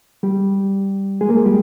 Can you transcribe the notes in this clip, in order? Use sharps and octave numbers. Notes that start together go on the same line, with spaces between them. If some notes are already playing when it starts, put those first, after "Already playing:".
G3 G4
G#3 G#4
A#3 A#4
G#3 G#4
G3 G4